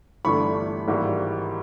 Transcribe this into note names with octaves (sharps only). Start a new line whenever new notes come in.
G1 G2 E3 A3 D4 B5 C#6
G#1 G#2 E3 G3 A#3